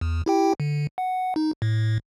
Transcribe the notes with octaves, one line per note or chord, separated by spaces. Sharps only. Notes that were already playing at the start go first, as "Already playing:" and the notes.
E2
E4 G4 G5
D3
F#5
D#4
A2